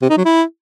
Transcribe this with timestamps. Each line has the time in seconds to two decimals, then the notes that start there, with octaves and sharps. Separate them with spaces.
0.02 C3
0.09 D#4
0.17 F#3
0.25 E4